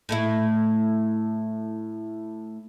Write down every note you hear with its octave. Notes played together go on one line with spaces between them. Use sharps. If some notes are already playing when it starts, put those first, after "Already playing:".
A2 A3 E4